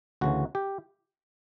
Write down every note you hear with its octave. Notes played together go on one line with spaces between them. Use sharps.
D2 C#3 E3 F#4
G4